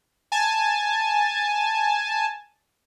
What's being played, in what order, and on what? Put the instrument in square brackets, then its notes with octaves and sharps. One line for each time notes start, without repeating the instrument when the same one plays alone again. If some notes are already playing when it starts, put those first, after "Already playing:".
[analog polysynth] G#5 A5